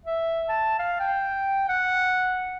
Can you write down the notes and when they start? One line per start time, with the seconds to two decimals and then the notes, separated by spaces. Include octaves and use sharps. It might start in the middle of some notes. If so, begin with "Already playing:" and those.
0.05 E5
0.49 A5
0.79 F5
1.00 G5
1.69 F#5